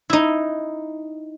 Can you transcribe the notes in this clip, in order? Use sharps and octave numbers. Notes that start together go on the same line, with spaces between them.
D#4 E4